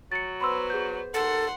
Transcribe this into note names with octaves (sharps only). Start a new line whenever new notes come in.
F#3 A6 C#7
B3 C5 B5 C6 E6
G#4 G6
D#2 A4 F#5 C6